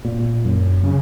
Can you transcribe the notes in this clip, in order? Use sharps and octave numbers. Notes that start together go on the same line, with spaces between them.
A#2
F#2
C#3